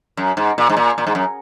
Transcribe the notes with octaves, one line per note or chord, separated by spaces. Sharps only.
F#2
G#2
A#2
G#2
A#2
A#2
G#2
F#2